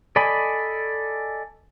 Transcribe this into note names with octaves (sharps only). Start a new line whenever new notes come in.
A4 D5 D#5 G#5 B5